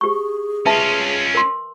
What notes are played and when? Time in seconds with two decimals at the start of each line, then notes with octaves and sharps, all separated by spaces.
0.01 G4 G#4 C#6
0.66 C#4 F4 B4 E5 A5
1.35 A#4 C6